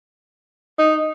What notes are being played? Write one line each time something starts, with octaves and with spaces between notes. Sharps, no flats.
D#4